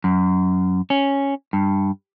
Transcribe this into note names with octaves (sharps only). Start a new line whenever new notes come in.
F#2
C#4
G2